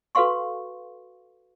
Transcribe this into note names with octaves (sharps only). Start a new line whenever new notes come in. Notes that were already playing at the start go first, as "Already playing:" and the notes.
F#4 A4 B4 F5 C6 C#6